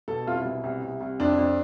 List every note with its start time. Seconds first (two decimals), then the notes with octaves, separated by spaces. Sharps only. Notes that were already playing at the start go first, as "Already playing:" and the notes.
0.08 B2 A4
0.27 C2 F4
0.35 E4
0.45 B2
0.64 C2
0.82 C2
1.01 C2
1.20 F2 D4
1.38 F2